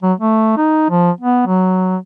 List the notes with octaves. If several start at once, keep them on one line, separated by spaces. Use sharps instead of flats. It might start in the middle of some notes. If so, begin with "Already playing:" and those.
F#3
A3
D#4
F3
B3
F#3